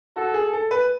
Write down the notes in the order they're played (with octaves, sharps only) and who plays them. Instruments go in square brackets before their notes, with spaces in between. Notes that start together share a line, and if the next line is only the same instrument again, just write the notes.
[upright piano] F#4 [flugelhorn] A4
[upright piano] G#4
A4
B4